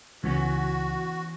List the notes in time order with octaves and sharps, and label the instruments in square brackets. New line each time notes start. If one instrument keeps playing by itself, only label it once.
[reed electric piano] C#2 [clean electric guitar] E3 B3 C#4 [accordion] F#4